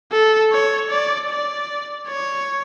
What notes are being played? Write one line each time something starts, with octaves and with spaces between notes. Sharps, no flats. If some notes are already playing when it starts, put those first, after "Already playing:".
A4
C#5
D5
D5
C#5